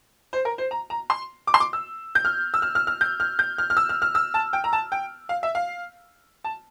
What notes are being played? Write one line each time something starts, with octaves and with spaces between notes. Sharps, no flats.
C5
A#4
C5
A#5
A#5
C6
D6
C6
D6
E6
G6
F6
E6
F6
F6
F6
G6
F6
G6
F6
F6
E6
F6
F6
E6
A5
G5
A#5
A5
G5
F5
E5
F5
A5